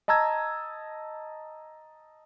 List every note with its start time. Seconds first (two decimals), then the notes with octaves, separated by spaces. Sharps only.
0.08 D#5 A5 A#5 E6 G#6